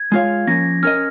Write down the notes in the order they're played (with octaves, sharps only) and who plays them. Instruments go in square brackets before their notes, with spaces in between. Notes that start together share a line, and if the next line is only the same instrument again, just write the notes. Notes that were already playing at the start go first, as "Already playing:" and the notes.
Already playing: [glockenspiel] G#6
[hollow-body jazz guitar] G#3 F4 C#5 F5
[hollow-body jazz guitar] F3 A#3 C#4 [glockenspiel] A#6
[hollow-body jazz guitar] C#4 A#4 D#5 [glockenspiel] F6